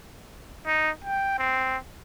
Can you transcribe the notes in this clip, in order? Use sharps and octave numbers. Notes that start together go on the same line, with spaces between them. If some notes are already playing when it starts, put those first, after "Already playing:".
D#4
G5
C4